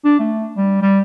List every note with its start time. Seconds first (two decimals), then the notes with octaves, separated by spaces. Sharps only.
0.05 D4
0.19 A3
0.57 G3
0.82 G3